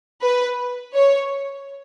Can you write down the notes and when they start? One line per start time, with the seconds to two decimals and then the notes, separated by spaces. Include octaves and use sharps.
0.22 B4
0.94 C#5